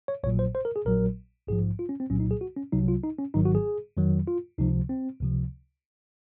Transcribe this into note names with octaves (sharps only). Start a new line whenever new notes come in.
C#5
A#1 A#2 F#3 C#5
C5
C5
A#4
G#4
A#1 A#2 F#3 A#4
A#1 G#2 F3 G#4
F4
C#4
C4
C2 A#2 F#3 C#4
D#4
G#4
F#4
C#4
C2 C3 F#3 D#4
F4
D#4
C#4
G#1 G#2 D#3 F#3 D#4
F#4
G#4
F2 D#3 F#3
F4
C#2 C3 F3 D#4
C4
C#2 C3 F3